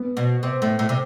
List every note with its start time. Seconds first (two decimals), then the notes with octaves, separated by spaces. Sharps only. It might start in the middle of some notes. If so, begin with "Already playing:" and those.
Already playing: B3
0.17 B2
0.43 C3
0.62 A2
0.79 A2
0.89 C3